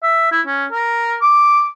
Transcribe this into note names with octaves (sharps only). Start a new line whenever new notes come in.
E5
E4
C#4
A#4
D6